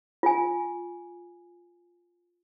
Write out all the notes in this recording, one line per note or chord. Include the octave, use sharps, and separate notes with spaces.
F4 G#5